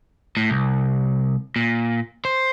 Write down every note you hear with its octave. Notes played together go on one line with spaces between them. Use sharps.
A2
C2
A#2
C5